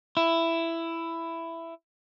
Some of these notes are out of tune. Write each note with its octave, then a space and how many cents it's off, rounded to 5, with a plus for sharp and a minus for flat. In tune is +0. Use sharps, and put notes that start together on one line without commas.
E4 +10